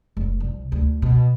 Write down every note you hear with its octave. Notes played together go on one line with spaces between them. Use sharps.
F1
C2
D2
B2